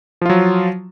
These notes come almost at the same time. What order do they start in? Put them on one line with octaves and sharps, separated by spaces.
F3 F4 F#3